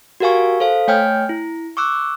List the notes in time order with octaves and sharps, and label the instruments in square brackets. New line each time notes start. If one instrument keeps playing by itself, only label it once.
[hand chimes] F#4 G4 A#4 F5 G#5 C#6
A4 C5 F5
A3 C#5 G5 G#5 F6 G6
E4
C#6 D6 E6 F#6